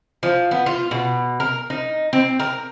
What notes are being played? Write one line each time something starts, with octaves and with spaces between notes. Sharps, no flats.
F3
B3
F4
B2
A#4
D#4
C4
A#4